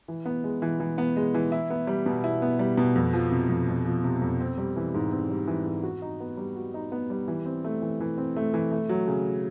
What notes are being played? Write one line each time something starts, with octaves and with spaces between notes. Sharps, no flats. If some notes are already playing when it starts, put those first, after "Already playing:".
E3
B3
G#3
E3
E3
B3
G#3
E3
E4
B3
G3
B2
E4
B3
G3
B2
F2
F3
C3
F2
F2
F3
C3
F2
C4
G3
E3
G#2
C4
G3
E3
G#2
F#4
D#4
B3
G3
F#4
D#4
B3
G3
E3
C4
A3
E3
E3
C4
A3
E3
A3
F#3
C#3